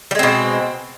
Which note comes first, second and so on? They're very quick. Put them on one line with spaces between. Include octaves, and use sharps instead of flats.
G3 G#3 C4 B2